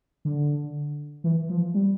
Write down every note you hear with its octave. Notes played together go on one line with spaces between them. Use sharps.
D3
E3
F3
G3